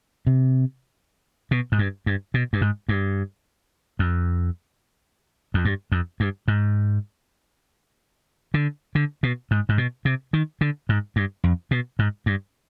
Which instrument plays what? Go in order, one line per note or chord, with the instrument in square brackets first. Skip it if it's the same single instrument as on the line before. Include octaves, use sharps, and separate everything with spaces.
[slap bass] C3
B2
G#2
G2
G2
B2
G2
G#2
G2
F2
F2
G2
F2
G2
G#2
D3
D3
B2
G#2
G#2
B2
C3
D#3
D3
G#2
G2
F2
B2
G#2
G2